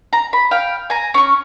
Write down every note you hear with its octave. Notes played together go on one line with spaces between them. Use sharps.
A#5
B5
F5 G5
G#5 A#5
C#4 C#6